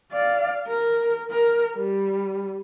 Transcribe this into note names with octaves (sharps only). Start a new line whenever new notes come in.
D5 F5
A#4
A#4
G3